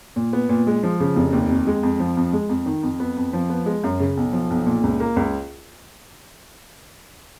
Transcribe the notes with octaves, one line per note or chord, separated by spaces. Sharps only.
A#2
B3
A#2
G#3
F3
C#3
F1
D#2
F2
G#3
F2
F3
F2
G#3
F2
D#3
F2
B3
F2
F3
B3
G#3
F#2
C#3
B1
F3
B1
A#2
C#2
A#3
C#2